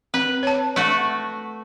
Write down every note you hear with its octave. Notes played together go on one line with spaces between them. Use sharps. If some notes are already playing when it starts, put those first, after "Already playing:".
C4 B4
C#5 A5
A3 F#4